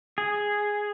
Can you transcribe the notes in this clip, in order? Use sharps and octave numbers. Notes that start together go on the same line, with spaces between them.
G#4